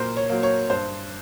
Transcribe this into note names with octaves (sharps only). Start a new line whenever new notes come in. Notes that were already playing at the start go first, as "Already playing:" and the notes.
Already playing: A#2 F#3 A#3 A#4 C5
C#5
F#3 A#3
C#5
G2 C5